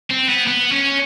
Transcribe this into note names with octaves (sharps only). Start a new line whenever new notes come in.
C4
B3
B3
C#4